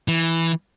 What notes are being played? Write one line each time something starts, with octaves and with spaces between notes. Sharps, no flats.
E3